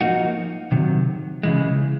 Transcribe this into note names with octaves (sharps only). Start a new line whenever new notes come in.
F3 A#3 D#4 F#4
C3 D#3 F#3
C#3 E3 G#3